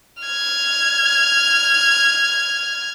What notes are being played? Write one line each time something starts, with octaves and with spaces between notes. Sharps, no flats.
F6 G#6